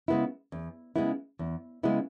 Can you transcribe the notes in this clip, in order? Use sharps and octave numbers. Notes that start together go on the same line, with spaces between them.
C#3 G#3 B3 E4
E2
C#3 G#3 B3 E4
E2
C#3 G#3 B3 E4